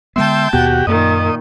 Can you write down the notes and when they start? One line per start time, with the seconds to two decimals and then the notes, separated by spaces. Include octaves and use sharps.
0.16 D3 G#3 B3 E5 G5 A5 C6 G6
0.53 D#2 B2 B3 F#4 G4
0.87 F#2 A#2 D#3 D#5